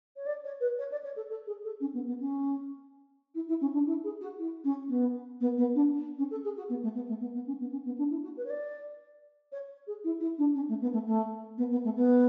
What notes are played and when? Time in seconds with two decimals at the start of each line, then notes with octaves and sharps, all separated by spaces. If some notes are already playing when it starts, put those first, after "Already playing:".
0.16 C#5
0.26 D5
0.43 C#5
0.60 B4
0.78 C#5
0.91 D5
1.04 C#5
1.16 A4
1.29 A4
1.46 G#4
1.64 A4
1.80 C#4
1.93 B3
2.06 B3
2.20 C#4
3.34 E4
3.48 E4
3.61 C#4
3.73 D4
3.86 E4
4.03 G#4
4.21 F#4
4.38 E4
4.64 C#4
4.89 B3
5.40 B3
5.57 B3
5.75 D4
6.18 C#4
6.30 A4
6.43 G#4
6.56 F#4
6.69 B3
6.82 A3
6.94 B3
7.08 A3
7.20 B3
7.34 B3
7.46 C#4
7.59 B3
7.71 C#4
7.84 B3
7.98 D4
8.10 E4
8.22 F#4
8.36 B4
8.44 C#5
8.49 D5
9.52 C#5
9.86 G#4
10.04 E4
10.20 E4
10.38 D4
10.54 C#4
10.68 A3
10.81 B3
10.92 A3
11.05 A3
11.57 B3
11.70 B3
11.84 A3
11.95 B3